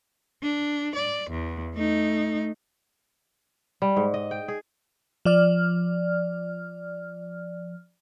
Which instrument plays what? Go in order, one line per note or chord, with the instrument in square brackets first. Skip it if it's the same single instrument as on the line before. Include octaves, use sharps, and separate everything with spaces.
[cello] D4
D5
E2
A3 D#4
[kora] G3
G#2
D#5
G5
G#4
[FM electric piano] F3 D5 F6